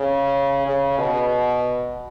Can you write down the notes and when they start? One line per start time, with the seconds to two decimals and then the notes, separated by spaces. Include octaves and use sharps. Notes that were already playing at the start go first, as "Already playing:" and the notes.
Already playing: C#3
0.67 C#3
0.98 B2